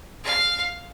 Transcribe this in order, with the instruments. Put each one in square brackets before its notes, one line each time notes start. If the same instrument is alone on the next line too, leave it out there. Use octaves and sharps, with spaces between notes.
[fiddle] F5